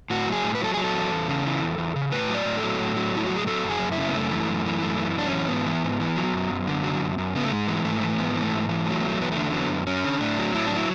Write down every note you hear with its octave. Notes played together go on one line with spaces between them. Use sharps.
A2 F#4
F#3
G#4
A2
B4
F#3 A4
F#3 G#4
A4
E2
E2
C#3
E3
E2
E2
C#3
A2 B4
F#3
D5
A2
A4
F#3
A2
F#3
A2 E4
F#3 F#4
G#4
F#3 A4
F#2
G#4
F#2
E4
C#3
B3
F#2 A3
E3
F#2
E3
F#2 A3
E3
F#2 D4
C#4
E3
G#2 B3
E3
G#2
E3
F#3
F#2
F#2
D3
F#3
F#2
F#2
C#3 B3
A3
G#2 G#3
E3
G#2 A3
E3
G#2 B3
E3
A3
G#2
E3
F#3 A3
B3
E2 A3
E2 B3
A3
D3
F#3 B3
F#2
F#2 C#4
D3
A2 D4
F#3
A2 E4
D4
F#3 E4